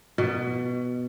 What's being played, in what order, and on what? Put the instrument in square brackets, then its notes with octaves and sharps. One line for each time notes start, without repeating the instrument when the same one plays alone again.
[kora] B2